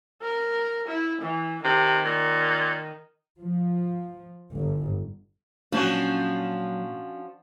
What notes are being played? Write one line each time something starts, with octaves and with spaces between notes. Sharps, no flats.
A#4
E4
E3
C3 D#3
A#2
F3
G1
A#2 F3 F#3 C#4 D4 F#4